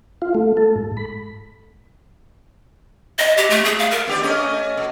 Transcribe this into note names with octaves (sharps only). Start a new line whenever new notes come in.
F4
A3
A4
G#2
B5
D#5
G4
A3
G#4
F5
A#4
B3 G4 D5
A3 C#4 D#5
B2